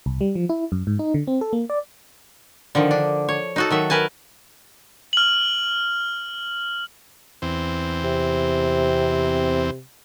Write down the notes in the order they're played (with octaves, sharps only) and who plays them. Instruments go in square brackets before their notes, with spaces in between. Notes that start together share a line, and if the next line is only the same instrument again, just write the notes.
[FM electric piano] C2
G3
F3
E4
F#2
G#2
D#4
D3
C4
A4
A#3
D5
[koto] D3 D#3 F3
D4
C#5
D#4 F#4 A4
D#3 F#3 E5
A#4 B4 G#5 A5
[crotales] F6 F#7
[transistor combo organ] E2 C4
[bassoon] C3